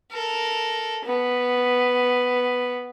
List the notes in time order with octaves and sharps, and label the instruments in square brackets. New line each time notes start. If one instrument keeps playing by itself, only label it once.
[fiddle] A4 A#4
B3